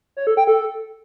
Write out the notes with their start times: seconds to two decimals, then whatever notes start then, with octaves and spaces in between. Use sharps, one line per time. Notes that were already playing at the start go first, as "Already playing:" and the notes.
0.17 C#5
0.27 A4
0.37 G5
0.47 A4